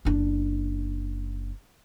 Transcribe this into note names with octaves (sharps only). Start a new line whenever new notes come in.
F#1 D4